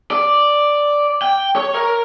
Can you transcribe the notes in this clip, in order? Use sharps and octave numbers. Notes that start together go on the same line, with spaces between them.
D5
G5
C#5
A#4